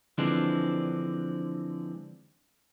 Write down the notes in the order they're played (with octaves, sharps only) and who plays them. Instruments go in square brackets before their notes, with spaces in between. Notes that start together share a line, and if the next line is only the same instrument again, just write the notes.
[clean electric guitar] D3 E3 F3 G#3 C4 D4